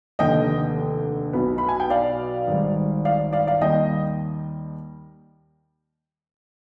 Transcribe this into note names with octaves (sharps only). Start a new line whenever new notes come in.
F1 D#2 D3 D#5 G5
B1 B2 B3
B5
G#5
G5
D5 F5
G#1 G#2 G3
D5 F5
D5 F5
D5 F5
D#2 D#3 G3 D#5 G5